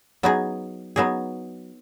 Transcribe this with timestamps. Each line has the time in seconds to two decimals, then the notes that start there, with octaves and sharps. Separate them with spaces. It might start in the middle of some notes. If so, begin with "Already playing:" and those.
0.23 F#3 B3 D#4 G#4
0.96 F#3 B3 D#4 G#4